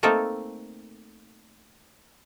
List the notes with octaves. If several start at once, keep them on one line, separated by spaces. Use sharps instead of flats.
A3 A#3 C4 D#4 A4 A#4